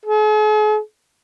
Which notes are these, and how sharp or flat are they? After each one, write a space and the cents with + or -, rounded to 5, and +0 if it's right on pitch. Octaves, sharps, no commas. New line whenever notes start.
G#4 +45